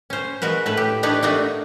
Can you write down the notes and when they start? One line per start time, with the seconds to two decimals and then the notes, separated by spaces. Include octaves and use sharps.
0.10 C#4 C5
0.42 G#3 F#4 A#4 B4
0.66 A2 A3 B4
0.77 G4
1.03 D4 D#4 G4 B4 C#5
1.23 A3 A#3 D4 D#4 F#4 D#5